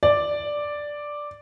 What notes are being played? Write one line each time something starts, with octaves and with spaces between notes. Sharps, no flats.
D5